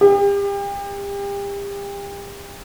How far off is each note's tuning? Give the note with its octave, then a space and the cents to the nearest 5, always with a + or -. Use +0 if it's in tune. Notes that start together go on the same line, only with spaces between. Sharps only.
G4 +35